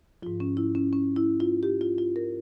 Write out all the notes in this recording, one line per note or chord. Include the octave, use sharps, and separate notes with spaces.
G#2 F3 F4
C#4
E4
C#4
C#4
E4
F4
G4
F4
F4
A#4